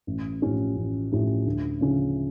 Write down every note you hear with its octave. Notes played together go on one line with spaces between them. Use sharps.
A1
A2 F3 C#4 G4
A1
A2 F3 C#4 G4
D2
C#3 F3 C#4